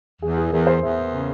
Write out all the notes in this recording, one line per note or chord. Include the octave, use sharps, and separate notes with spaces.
E2 G#4
G#4
E2 A#4
C5
E2 E5
C#3